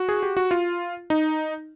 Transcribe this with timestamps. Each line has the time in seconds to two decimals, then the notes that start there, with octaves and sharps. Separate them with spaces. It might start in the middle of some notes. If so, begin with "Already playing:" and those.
Already playing: F#4
0.09 G#4
0.23 G4
0.37 F#4
0.51 F4
1.10 D#4